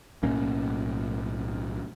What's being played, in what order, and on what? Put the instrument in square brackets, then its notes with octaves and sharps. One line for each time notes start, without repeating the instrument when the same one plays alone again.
[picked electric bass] B1 A2 A#3 C#4